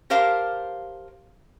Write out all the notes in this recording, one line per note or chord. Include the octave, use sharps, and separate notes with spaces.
G4 A#4 C5 F5 A5